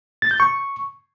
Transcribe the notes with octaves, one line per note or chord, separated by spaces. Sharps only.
A6
G6
C#6